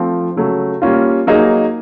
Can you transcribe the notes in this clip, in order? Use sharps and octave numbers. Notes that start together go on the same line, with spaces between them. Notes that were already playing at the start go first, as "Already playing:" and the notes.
Already playing: F3 A3 C4 F4
C#3 F#3 A3
G3 A#3 C#4 F4
F#3 A#3 D#4 G#4